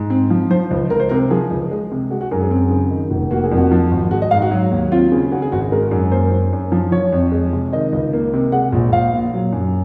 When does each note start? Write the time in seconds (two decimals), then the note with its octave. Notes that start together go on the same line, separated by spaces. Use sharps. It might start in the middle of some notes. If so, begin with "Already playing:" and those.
Already playing: G#2
0.10 C4
0.30 F3
0.51 F3 C5
0.71 C#2
0.90 C#2 A#4
1.00 C5
1.09 C3 A#4
1.30 F3 G#4
1.51 C#2
1.71 G#3
1.91 C3
2.10 G#3 F#4
2.21 F#4
2.31 F#2 A#4
2.41 G#4
2.51 C4
2.71 C#3
2.91 D#3
3.11 F1
3.31 A#3 F#4
3.44 G#4
3.52 F2
3.57 F#4
3.71 F3
3.91 G#1
4.11 G#3 F#4
4.22 D#5
4.31 G#2 F5
4.42 F#4
4.51 F#3
4.71 D#2
4.92 C4 F4
5.12 C#3
5.32 C#3 F#4
5.42 G#4
5.52 G#1 F#4
5.61 G#4
5.72 G#3 A#4
5.91 F#2
6.12 A#3 C5
6.32 F#2
6.53 F#2
6.72 F3
6.92 F3 C#5
7.13 F2
7.32 G#3
7.53 C3
7.72 D#3 D#5
7.92 C#2
8.13 A#3
8.33 C3
8.52 G#3 F#5
8.73 A#1
8.92 A#1 F5
9.13 A#2
9.34 F#3
9.53 F#2